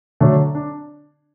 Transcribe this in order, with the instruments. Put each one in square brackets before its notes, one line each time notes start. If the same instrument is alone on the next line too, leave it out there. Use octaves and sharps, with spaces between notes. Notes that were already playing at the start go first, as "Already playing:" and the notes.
[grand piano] D3 F#3 A3 D4
D4